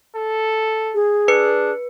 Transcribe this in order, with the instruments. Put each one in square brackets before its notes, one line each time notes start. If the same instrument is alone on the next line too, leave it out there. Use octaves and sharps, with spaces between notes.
[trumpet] A4
[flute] G#4
[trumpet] D4 [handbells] B4 C#7